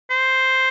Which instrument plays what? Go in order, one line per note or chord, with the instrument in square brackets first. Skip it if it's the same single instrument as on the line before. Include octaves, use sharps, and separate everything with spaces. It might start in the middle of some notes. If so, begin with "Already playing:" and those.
[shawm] C5